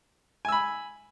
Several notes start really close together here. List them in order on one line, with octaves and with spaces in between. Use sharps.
G#5 E6 B5